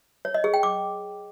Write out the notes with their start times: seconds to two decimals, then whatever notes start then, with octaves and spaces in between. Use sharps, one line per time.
0.25 C#5
0.34 D#5
0.44 G#4
0.54 G5
0.63 D6